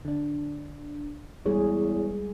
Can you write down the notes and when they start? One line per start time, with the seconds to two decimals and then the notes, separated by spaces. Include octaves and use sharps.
0.05 D3 D4
1.46 E2 G3 G#3 G#4 C#5